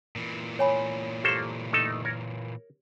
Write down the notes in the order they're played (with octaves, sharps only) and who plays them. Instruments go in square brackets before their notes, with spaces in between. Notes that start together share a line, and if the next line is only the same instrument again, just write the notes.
[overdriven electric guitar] A#2 E3
[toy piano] C#5 G#5 B5
[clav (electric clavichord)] A#3 A4 C5 [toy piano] G4 C6
[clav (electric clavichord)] A3 D#4 A4
A#4 C#5